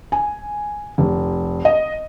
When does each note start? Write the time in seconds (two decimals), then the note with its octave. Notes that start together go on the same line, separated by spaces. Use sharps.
0.12 G#5
0.98 F1
1.65 D#5